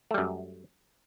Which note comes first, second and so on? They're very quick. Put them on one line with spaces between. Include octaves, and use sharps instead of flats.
A3 G3 F#2